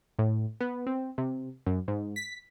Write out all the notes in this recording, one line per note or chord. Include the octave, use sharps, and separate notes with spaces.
A2
B3
C4
C3
F#2
G#2
B6